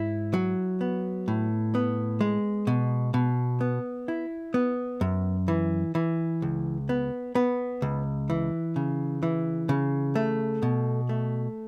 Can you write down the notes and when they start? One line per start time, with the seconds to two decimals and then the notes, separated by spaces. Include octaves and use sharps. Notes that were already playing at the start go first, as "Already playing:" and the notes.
Already playing: G#2 E4
0.34 F#3
0.81 B3
1.28 A2
1.75 B3
2.21 G#3
2.67 B2
3.14 B2
3.61 B3
4.08 E4
4.54 B3
5.01 F#2
5.48 E3
5.95 E3
6.42 C#2
6.89 B3
7.35 B3
7.82 C#2
8.30 E3
8.76 C#3
9.23 E3
9.69 C#3
10.16 A3
10.62 B2
11.09 A3